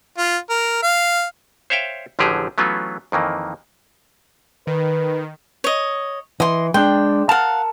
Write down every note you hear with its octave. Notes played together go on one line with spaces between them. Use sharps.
F4
A#4
F5
C5 C#5 E5 F5 G5
A1 D3 F3 F#3 G4 G#4
E3 F#3 A3 B3 C#4 F4
F2 D#3 E3 A#3
D#3 B4
C#5 D#5
E3 D#5 C6
G#3 D4 G5
A#4 F5 F#5 A5